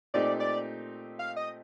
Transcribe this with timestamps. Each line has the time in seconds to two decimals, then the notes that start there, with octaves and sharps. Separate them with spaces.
0.14 A#2 A3 C4 D#4 G4 D5
0.40 D5
1.19 F5
1.36 D#5